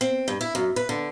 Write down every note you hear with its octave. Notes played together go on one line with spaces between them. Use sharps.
C4
G2
E4
F#2
B4
D3